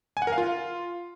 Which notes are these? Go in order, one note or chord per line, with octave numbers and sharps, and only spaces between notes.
G#5
F#5
A#4
F5
F4